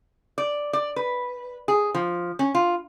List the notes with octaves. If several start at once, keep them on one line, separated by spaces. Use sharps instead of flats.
D5
D5
B4
G#4
F3
C#4
F4